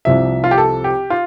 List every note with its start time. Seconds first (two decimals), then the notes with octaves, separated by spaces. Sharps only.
0.05 C2 C3 F3 E5
0.44 F4
0.51 G4
0.58 A4
0.84 G4
1.10 F4